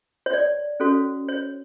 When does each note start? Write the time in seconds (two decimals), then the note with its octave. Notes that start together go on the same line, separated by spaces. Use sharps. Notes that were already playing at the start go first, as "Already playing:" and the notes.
0.26 C#5
0.33 D5
0.80 C#4 F#4 A4 C#5
1.29 C#5